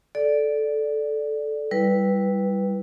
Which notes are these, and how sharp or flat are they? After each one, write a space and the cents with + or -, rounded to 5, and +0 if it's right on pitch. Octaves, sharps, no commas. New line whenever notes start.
A4 -10 D5 +0
G3 +0 E4 +0 B4 -5